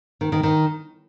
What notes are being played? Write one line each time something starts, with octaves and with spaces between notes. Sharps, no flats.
D#3
D#3
D#3